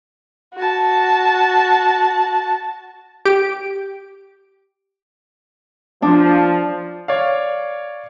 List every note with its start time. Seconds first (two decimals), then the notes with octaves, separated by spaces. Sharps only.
0.55 F#4 A5
3.25 G4 D7
6.02 F3 D4
7.08 C#5 D5 F5